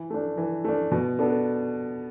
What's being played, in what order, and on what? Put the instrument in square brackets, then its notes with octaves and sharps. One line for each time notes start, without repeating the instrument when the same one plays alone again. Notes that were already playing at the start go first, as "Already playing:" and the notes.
Already playing: [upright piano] E3
A3 D4
E3
A3 D4
B2
B3 D4 A4